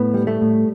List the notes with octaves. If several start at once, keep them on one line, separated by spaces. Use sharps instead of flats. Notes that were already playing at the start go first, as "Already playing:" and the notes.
Already playing: A2 B3
G3
A3
A2